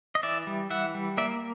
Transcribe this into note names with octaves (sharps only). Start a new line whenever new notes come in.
D#5
E3 D5 E5
G3
E3 E5 F#5
G3
A#3 D5 E5